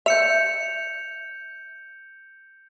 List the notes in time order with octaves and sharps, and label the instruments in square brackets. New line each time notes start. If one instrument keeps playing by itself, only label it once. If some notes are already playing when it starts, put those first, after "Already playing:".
[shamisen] E5 [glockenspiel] G6 C#7 F7